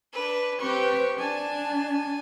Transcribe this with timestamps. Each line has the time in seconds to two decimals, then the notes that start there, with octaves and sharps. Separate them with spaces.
0.13 D4 B4
0.60 C4 G4 B4 C#6
1.19 D4 G#5 A5